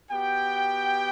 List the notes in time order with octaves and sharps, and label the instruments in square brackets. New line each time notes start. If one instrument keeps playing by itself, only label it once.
[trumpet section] B3 F#4 G4 G5